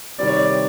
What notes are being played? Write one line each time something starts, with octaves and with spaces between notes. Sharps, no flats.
C3 D#3 G3 C4 D5
C#5
D5